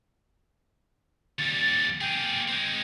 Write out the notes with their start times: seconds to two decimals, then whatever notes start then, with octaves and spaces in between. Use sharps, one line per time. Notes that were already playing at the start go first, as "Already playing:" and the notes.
1.39 D#2 G3 A6
2.01 A#3 G#4 G5
2.48 G#3 C4